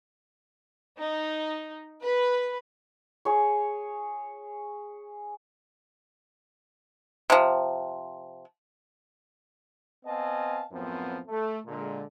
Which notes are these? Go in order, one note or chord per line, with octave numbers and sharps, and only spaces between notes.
D#4
B4
G#4 C#5
C3 F3
B3 C4 D#5 F5 G#5 A5
F#2 A2 F3 B3 C4
A3
A#2 D3 G#3